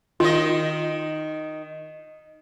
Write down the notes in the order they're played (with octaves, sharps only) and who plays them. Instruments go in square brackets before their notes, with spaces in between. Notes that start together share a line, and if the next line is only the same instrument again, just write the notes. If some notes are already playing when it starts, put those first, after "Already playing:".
[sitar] D#3 D#5 [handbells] F4